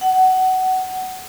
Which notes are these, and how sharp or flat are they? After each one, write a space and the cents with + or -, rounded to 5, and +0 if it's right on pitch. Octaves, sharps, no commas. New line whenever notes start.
F#5 +20